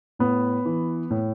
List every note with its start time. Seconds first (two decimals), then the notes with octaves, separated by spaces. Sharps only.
0.19 A2 B3
0.65 E3
1.11 A2